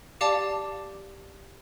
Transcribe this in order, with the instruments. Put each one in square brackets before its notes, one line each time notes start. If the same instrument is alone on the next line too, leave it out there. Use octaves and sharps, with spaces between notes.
[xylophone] G4 D5 F5 A5 D6